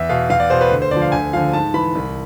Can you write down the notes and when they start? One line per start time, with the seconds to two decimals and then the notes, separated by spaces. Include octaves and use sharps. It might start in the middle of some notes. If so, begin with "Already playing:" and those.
Already playing: E2 E5
0.09 B2 F5
0.30 E2 F5
0.40 D5
0.50 B2 C5
0.61 B4
0.71 D2
0.82 C5
0.91 D3 F3 D5
1.02 F5
1.12 D2 G#5
1.33 D3 F3 F5
1.53 G#2 A5
1.74 E3 B5
1.95 C2